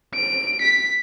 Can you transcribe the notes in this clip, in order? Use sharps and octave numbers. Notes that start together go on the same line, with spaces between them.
D7
B6